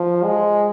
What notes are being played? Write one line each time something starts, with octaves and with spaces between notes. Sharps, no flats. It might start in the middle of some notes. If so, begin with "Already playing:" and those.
Already playing: F3
G#3